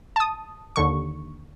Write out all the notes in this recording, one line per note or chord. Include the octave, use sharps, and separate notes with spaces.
A5 D#6
D#2 D3 C#6